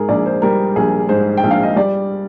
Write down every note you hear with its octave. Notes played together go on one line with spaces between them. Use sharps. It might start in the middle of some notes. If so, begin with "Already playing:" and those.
Already playing: G#2 G#4 A#4
A#1 D5
C5
G3 A#4
A#1 G#4
G#2 C5
G5
A#1
F5
D#5
G3 D5